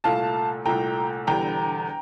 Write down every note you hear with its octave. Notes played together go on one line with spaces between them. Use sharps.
C2 A#2 A3 F5 A5
C2 A#2 A3 G5 A#5
E1 E2 D3 G3 G5 A#5